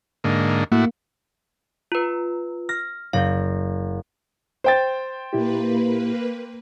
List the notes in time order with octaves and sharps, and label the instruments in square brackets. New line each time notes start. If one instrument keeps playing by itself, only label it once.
[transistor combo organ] G#2 D3 A#3
[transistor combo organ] A2 E4 F#4 [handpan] A#3
[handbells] F4 B4
[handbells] F6 [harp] A#6
[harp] F#1 G6 [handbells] F5
[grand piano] C5 G5 A6
[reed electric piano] A#2 E4 G4 [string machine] A#3 B4